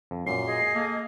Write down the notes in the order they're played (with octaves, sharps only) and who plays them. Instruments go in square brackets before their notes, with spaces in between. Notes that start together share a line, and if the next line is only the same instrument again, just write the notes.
[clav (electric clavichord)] F2
[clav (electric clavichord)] F#2 A#2 [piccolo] C7
[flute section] G#4 D#5
[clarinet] A#3 [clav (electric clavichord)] A4